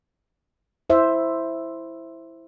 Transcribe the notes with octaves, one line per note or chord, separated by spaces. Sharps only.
E4 C5 E5